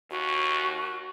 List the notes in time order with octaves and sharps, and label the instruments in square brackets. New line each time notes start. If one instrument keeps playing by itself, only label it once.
[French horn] D#2 [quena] F#4